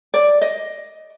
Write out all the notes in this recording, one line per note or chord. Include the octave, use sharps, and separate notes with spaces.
D5
D#5